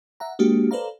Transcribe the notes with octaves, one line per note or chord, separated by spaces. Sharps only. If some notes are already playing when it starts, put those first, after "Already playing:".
E5 F#5 A#5
G#3 A#3 D4 F#4 G4
A4 B4 C5 D5 F5 A#5